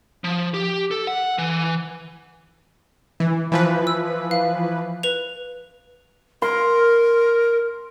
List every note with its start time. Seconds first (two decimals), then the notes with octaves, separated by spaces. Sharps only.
0.24 F3
0.54 G4
0.91 A4
1.07 F#5
1.38 E3
3.20 E3
3.52 E3 F3 B4
3.87 E6
4.31 F5
5.03 B4 F7
6.42 A#4 C6